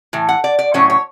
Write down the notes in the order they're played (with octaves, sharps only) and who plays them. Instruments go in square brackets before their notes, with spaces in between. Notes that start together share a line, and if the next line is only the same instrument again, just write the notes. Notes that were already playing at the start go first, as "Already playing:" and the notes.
[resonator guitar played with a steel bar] A2 E3
F#5
D5
D5
A2 F#3 C#4 C#5
C#5